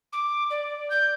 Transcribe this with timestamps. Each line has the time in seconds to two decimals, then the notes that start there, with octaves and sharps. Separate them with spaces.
0.12 D6
0.50 D5
0.90 G6